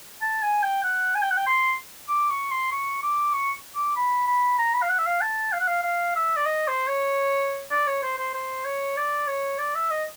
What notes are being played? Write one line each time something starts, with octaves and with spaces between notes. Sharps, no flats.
A5
G#5
G5
F#5
G#5
G5
F#5
G5
C6
D6
C#6
C6
C#6
D6
C#6
D6
B5
B5
A#5
B5
F5
F#5
E5
F5
A5
F5
F#5
F5
F5
E5
D5
D#5
C5
C#5
D5
C#5
C5
C5
C5
C#5
D5
C#5
D5
E5
D#5